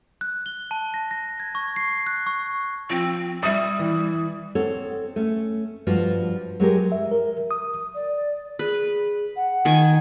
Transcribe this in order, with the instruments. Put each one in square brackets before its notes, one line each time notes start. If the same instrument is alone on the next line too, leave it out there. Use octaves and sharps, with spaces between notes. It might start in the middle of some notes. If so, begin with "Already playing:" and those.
[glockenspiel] F#6
G7
A5
A#6
A#6
G#6
C#6
C7
F#6
C#6
[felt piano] F3 [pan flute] C4
[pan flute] G3 [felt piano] E5 D#6
[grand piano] E3
[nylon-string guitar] C4 A4 C#5 F#5
A3 C#4
G2 F3 F4 F#4
F#3 G#3 G4 A#4
[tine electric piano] E5
A#4
D#6
[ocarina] D5
[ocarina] G#4 [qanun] B4
[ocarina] F#5
[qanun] D#3 G#5